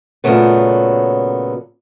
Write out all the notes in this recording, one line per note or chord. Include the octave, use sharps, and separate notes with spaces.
A#2 C#3 F#3 A3 B3